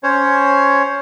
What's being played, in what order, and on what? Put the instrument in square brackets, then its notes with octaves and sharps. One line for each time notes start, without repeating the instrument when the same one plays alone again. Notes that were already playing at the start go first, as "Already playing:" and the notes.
[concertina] C#4 C5 C#5